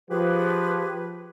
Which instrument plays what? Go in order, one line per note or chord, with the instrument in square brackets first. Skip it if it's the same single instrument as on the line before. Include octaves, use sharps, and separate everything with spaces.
[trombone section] F3 [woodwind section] G4 G#4 B4